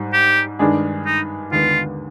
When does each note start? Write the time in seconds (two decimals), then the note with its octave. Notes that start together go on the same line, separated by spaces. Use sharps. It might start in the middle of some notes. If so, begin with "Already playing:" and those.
Already playing: G#2 G3
0.13 G4
0.59 G2 D#3 G#3 D4 G#4
1.06 D#4
1.52 D#2 D3 G#3 B3 F4